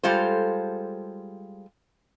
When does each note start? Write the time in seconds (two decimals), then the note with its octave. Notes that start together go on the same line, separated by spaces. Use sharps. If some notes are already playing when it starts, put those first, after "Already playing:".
0.03 G3 G#3 F4 A4 C5